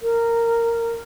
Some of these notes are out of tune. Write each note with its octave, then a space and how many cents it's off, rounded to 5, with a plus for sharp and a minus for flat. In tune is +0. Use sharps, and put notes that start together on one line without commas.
A#4 -10